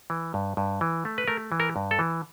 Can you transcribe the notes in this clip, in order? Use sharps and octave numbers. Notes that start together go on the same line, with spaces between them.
E3
G2
G2
E3
A3
B4
A3 A#4
E3
A#4
G2
A4
E3